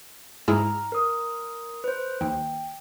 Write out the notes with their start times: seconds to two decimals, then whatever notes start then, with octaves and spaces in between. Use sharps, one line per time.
0.48 G#2 E4 G#4 A#5 F6
0.92 A#4 D#6
1.84 B4 C5
2.21 D#2 G5